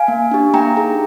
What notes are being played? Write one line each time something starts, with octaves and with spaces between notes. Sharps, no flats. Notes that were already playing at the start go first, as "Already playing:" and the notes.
Already playing: F5 G#5
A#3
D4 G4
A#3 G5 A#5
D#4 G#4